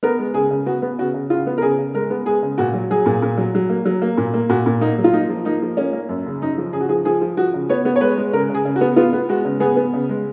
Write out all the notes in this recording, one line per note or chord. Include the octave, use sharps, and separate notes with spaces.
B3 A#4
G#3
C#3 G#4
C#3
B3 F#4
B3
C#3 F#4
C#3
C#3 F4
B3
A#4
C#3 G#4
C#3
G#3 A#4
B3
G#3 G#4
C#3
A#2 F#4
F#3
F#3 G#4
A#2
A#2
F#3
F#3
A#3
F#3
A#3
A#2
A#3
A#2 F#4
A#2
A#3 D#4
F#3
F4
A#3 D#4
F3
A#3 D#4
F3
A#3 C#4
A#3
F#2
C#3
F#2 D#4
F3
C#3 G#4
F#4
F3 G#4
F3 G#4
F3
F3 F#4
C#3
B3 C#5
B3
C#5
G#3 B4
G#3
C#3 A#4
C#3
G#4
C#3
F#4
B3
B3 F4
B3
G#3 F#4
C#3
B3 G#4
B3
C#3
G#3